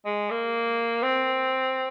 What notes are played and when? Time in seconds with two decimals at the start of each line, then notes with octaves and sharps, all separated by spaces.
0.05 G#3
0.30 A#3
1.03 C4